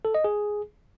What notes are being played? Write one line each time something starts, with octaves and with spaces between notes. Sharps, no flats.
A4
D#5
G#4